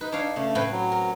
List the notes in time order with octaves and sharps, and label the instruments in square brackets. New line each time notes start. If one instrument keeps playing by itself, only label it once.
[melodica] D#4 [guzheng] B4
[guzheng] D4 C#5 F5
[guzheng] C#3 [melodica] A3
[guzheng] A2 C4 B4
[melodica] F#3
[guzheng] A#4